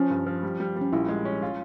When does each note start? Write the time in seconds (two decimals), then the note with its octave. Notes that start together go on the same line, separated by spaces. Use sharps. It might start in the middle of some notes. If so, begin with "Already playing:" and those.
Already playing: F3 C#4
0.10 G2
0.26 F3
0.43 G3
0.60 G3
0.76 G3 C#4
0.93 A#1 E4
1.08 G#3
1.25 C#4
1.42 F4